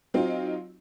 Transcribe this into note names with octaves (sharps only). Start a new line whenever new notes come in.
F#3 C4 D#4 F4